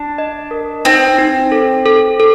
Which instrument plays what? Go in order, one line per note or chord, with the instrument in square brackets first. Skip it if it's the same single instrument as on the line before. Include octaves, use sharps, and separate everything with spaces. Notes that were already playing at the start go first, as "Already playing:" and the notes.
Already playing: [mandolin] D4
[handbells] D#5
A#4
[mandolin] C4 [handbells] D#4
[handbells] D#4
A4
A4
A4